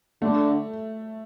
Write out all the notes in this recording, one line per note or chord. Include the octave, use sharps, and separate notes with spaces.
D3 A3